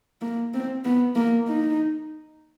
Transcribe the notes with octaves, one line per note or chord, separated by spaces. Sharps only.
A#3
C4
B3
A#3
D#4